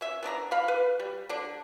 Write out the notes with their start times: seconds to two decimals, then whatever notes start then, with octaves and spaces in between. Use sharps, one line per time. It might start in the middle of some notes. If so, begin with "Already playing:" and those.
0.01 C#4 E5
0.23 B3 D4 D5 A#5
0.51 F5 B5
0.68 B4
0.99 G3
1.29 D3 D4